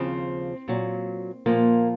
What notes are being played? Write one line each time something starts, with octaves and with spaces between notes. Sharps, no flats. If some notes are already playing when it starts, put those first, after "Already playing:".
Already playing: D#2 C#3 F3 C4
A#2 F#3
A#2 F3 A#3